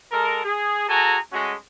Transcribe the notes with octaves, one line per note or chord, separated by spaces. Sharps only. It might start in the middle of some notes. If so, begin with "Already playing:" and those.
G#3 A4 A#4
G#4
F#4 G#4 A4 G#5 A#5
G#3 A3 C#4 F#4